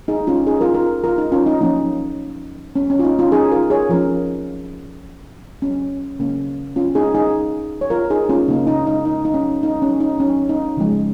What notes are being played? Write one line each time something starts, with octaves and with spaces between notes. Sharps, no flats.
D#4 G#4
C#4 F4
D#4 G#4
F4 A#4
F4 A#4
F4 A#4
D#4
C#4 F4
D#4
F3 A#3 C#4 D#4
C#4
C#4
F4
D#4
C#4 F4
D#4 G#4
F4 A#4
G#4 C#5
F3 C#4 F4 A#4
C#4
C#3 A#3 C#4
C#4 F4
D#4 G#4
D#4 G#4
C#5
F4 A#4
D#4 G#4
C#4 F4
C#3 A#3 C#4 D#4
D#4
D#4
D#4
D#4
C#4
D#4
C#4
D#4
C#4
D#4
C#3 F3 G#3 C#4